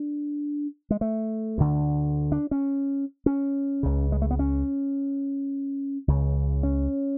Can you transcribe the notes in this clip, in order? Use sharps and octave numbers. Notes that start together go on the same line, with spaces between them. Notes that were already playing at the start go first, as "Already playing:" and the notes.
Already playing: D4
G#3
A3
D2 D3
D4
C#4
C#4
C#2 C#3
G#3
A3
B3
C#4
C#2 C#3
C#4